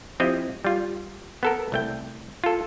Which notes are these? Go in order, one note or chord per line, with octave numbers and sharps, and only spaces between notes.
F3 C4 E4 G4 D#5
G3 F4
B3 A4 A#4
C2 A3 G5
F4 A4